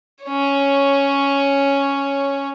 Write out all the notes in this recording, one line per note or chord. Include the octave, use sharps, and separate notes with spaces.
C#4 C#5